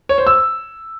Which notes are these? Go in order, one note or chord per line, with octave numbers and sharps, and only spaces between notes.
C#5
C5
E6